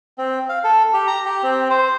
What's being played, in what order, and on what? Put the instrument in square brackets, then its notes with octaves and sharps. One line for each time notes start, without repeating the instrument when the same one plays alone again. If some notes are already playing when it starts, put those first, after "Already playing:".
[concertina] C4
F5
A4
G4
A#5
G4
C4
C5